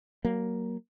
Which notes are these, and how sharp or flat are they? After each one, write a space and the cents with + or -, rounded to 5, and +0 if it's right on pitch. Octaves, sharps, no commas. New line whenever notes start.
F#3 +25 A#3 +0